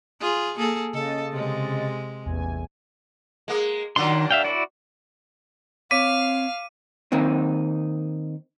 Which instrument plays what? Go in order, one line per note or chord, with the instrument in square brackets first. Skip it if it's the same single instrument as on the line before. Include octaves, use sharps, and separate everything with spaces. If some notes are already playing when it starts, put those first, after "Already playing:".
[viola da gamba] F4 G#4
A#3 G#4 A4
[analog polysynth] C#3 D#5 A6 [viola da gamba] A4
[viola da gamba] C3 G#3
[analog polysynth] A1 E2 G#5
[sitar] G#3 A#3
[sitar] A#2 F#3 D4 [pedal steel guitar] D#3 C6
[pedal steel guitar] E5 F5 G5
E4 F#4 D5
[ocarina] C4 [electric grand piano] C#5 D6 B6 [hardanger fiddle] F5 [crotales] D#7
[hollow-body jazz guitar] D#3 A#3 C4 D#4